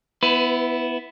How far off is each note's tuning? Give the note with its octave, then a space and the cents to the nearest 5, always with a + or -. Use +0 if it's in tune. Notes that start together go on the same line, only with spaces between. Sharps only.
B3 +0 E4 +0 B4 +35